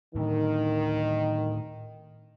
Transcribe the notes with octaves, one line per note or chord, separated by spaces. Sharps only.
A2 D3 D#3